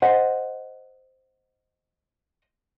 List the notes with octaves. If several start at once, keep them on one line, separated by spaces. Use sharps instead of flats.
C5 D#5 F#5